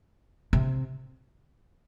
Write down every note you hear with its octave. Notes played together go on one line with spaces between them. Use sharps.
C3